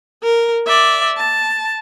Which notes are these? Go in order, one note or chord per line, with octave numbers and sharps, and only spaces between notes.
A#4
D5 E5
A5